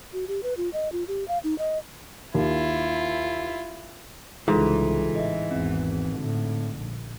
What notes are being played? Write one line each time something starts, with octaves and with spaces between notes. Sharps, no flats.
F#4
G4
B4
F4
D#5
F4
G4
F5
D#4
D#5
D#2 E4 F4
C2 G#2 C#3 E3 F4 A4
A1 D#5 E5
G#1 E2 C4
A2 D3
A#1